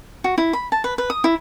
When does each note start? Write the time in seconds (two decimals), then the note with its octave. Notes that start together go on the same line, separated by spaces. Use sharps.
0.24 F#4
0.38 E4
0.53 B5
0.72 A5
0.84 B4
0.98 B4
1.10 D#6
1.24 E4